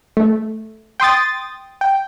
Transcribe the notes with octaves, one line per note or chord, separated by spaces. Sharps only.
A3
G5 C6 D#6 A6
G5